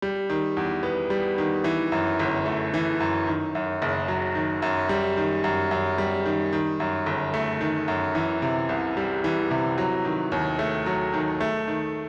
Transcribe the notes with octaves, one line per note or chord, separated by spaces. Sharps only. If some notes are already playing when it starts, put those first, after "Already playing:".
G3
D#3
E2
B3
G3
D#3
E3
F#2
G1
A3
E3
F#2
D#3
F#2
F#1
F#3
D#3
F#2
G3
D#3
F#2
F#2
G3
D#3
D#3
F#2
G1
A3
D#3
F#2
E3
C3
C2
G3
E3
C3
F#3
D#3
D#2
A3
F#3
D#3
A3
D#3